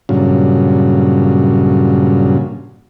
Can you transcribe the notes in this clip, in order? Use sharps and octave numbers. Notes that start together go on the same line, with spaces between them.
G2 A#2 C#3 F#3